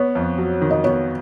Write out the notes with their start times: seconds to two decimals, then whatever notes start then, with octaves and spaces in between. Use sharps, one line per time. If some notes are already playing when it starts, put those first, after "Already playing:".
Already playing: B3 C#5
0.15 F2
0.38 F#3
0.61 D#3
0.71 D#5
0.84 B3 C#5